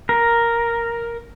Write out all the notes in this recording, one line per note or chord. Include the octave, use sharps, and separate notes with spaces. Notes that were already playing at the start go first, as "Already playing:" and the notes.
A#4